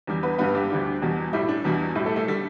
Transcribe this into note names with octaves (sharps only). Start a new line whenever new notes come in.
E2 D3 G3
B3 B4
G2 D3 G3 B3 B4
G3 G4
D2 D3 G3
E2 B2 G3
A2 G3 E4
D4
E2 B2 G3
A2 G3 E4
A3 A4
A3 A4
D3 G3